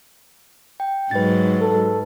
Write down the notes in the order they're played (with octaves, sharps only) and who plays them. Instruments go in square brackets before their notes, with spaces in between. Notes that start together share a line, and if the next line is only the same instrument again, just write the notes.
[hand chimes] G5
[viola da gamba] G#2 F#3 [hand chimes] B4 A6
[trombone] A4